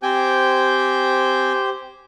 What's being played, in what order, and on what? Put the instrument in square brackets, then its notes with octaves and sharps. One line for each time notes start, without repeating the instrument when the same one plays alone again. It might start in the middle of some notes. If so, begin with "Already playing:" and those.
[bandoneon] C4 G5 G#5 [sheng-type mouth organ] G4 C5 G6